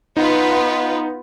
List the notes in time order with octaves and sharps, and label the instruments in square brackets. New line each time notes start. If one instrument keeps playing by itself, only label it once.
[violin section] B3 F4 B4 [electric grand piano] D#4